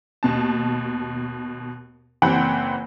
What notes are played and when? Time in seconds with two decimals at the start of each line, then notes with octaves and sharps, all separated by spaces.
0.23 D#2 B2 A5
2.22 F#1 E3 C4 F#5 G5 B5